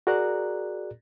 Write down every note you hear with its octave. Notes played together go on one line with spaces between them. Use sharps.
F#4 G#4 A#4 D5 A#5 F#6